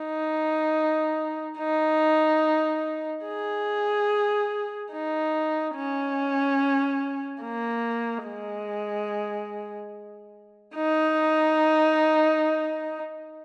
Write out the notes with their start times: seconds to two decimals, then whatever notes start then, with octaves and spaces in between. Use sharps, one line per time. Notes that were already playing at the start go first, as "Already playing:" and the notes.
Already playing: D#4
1.58 D#4
3.26 G#4
4.92 D#4
5.75 C#4
7.42 A#3
8.26 G#3
10.75 D#4